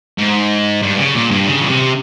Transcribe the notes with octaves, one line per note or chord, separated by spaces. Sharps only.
G#2
G2
C#3
A#2
G2
C#3
A#2
C3